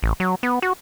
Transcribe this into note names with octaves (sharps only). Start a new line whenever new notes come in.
A1
F#3
B3
F#4